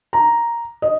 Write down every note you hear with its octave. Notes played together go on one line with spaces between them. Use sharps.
A#5
D#5